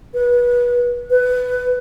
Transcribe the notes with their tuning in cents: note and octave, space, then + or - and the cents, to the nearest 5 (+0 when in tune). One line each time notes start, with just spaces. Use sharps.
B4 -25
B4 +15